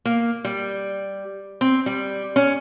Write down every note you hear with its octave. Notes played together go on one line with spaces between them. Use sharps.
A#3
G3
C4
G3
C#4